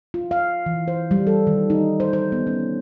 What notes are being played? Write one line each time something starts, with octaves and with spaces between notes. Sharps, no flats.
F4
F5
E3
C5
G3
A4
D#3
D#4
C5
C5
B3
C#4